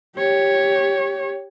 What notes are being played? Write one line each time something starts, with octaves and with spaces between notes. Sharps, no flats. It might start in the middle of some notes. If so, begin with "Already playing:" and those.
G4 C#5